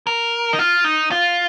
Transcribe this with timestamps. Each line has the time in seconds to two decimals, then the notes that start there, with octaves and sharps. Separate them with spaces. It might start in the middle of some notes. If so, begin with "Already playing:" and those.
0.07 A#4
0.53 D#4
0.59 F4
0.84 D#4
1.11 F4